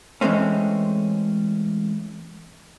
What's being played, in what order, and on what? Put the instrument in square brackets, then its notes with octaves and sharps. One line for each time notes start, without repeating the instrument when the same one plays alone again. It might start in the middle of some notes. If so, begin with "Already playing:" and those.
[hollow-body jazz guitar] E3 G#3 A3 C4 C#4